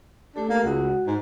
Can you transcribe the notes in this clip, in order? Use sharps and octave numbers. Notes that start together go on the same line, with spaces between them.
A3 D4 G4 A4
A#3
C#2 G#3 F#4 F#5
G#2